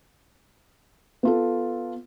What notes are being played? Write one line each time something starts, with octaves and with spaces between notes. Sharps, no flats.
B3 F4 A4